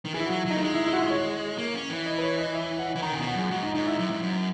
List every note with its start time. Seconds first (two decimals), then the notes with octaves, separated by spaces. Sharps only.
0.05 D#3
0.14 E3 G#4
0.20 E4
0.26 F#4
0.30 F#3
0.46 F#3 D#4
0.56 A#3
0.62 G#3 D#4
0.74 E4
0.86 E4
0.93 F#4
0.98 E4
1.10 C#5
1.58 A#3
1.74 C#4
1.90 E3
2.06 D#5
2.18 B4
2.23 C#5
2.38 D#5
2.55 E5
2.79 F#5
2.96 E3
3.02 D#3 A#5
3.12 C#3
3.15 G#5
3.19 B2
3.27 F#5
3.35 F#2 G#4
3.50 G#2 F#4
3.63 D#4
3.74 G#2 D#4
3.87 E4
3.99 F#2
4.10 G#2
4.22 F#2